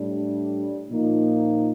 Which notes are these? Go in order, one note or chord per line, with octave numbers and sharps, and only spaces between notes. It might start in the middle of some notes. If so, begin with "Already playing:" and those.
Already playing: A2 G3 D4
A#2 F3 A#3 D#4